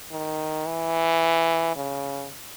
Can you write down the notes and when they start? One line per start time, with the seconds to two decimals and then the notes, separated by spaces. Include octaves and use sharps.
0.12 D#3
0.67 E3
1.76 C#3